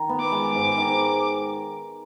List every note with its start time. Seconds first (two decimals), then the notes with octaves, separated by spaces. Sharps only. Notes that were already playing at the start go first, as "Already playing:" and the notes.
Already playing: D#3
0.09 B3
0.20 D6
0.32 G#3
0.55 G#2
0.78 D#3